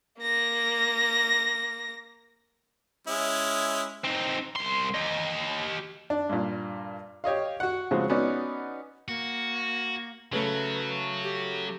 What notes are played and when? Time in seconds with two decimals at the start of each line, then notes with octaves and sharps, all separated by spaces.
0.20 A#3 A#6
3.07 G#3 C#4 E4
4.04 C4 D#4
4.56 C2 C6
4.95 G4 D#5
6.10 D4
6.30 G2 A#2
7.24 G4 C#5 D#5 F5
7.60 F#4 F#5
7.91 C#3 F3 G#3 C4 F#4
8.10 B3 C#4 D#4 F#4 D5
9.08 A#3 F#4
10.33 C#3 F#3 A3 B4
11.23 G4